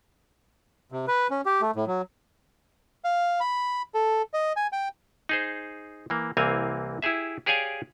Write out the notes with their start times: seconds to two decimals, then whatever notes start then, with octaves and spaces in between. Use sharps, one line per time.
0.92 C3
1.08 B4
1.31 C#4
1.46 G4
1.62 A3
1.76 A2
1.87 F#3
3.04 F5
3.40 B5
3.94 A4
4.34 D#5
4.56 G#5
4.72 G5
5.29 D#4 G#4 C5
6.10 E3 A#3
6.37 C2 E3 A#3 C4 F5 G#5
7.02 E4 G4 G#4 E5
7.46 G4 G#4 C#5 D5 F5 G#5